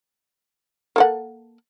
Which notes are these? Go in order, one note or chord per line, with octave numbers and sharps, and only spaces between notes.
A#3 A4 F#5